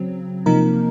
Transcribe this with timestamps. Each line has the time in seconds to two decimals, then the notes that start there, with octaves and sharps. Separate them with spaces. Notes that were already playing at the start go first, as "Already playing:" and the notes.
Already playing: C#3 F#3 C4
0.46 C3 F3 A#3 D#4 A#4